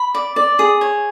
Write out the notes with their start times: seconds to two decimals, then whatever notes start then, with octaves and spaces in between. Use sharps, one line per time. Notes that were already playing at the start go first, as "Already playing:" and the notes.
Already playing: B5
0.15 D5
0.36 D5
0.59 G#4
0.81 C#5